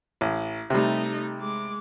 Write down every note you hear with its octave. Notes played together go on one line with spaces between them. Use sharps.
A1
C3 G3 A3 D#4
G#3 D6